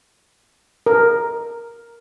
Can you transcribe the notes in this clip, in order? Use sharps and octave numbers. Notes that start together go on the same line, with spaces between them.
A#4